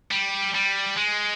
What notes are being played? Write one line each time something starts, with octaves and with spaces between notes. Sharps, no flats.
G3
G3
G#3